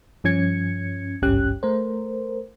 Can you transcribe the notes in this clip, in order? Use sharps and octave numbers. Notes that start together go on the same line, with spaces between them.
G2 F3 C#4 G#6 C#7
G#1 C#2 G2 C#4 G4 F#6
A3 A#4 C5